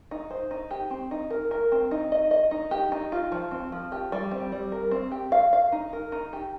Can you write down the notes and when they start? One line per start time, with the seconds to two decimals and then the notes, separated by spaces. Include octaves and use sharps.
0.11 D#4
0.31 C5
0.51 D#4
0.71 G4
0.90 C4
1.11 D#4
1.30 A#4
1.51 A#4
1.72 C4
1.91 D#4
2.12 D#5
2.31 D#5
2.51 D#4
2.71 G4
2.92 D#4
3.12 F4
3.32 F3
3.51 C4
3.72 F3
3.92 G4
4.12 G3
4.32 C4
4.52 G3
4.72 A#4
4.91 C4
5.11 G4
5.32 F5
5.53 F5
5.72 D#4
5.93 A#4
6.12 D#4
6.33 G4